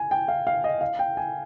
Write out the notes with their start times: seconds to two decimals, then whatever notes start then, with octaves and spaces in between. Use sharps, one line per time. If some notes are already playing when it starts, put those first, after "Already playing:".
Already playing: G#5
0.11 G5
0.28 F5
0.47 F5
0.64 D#5
0.81 F5
0.99 G5
1.17 G#5